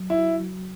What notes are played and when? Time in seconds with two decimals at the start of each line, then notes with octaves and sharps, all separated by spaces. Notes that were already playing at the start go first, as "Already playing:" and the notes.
Already playing: F#3
0.10 E4
0.17 F#4
0.40 F#3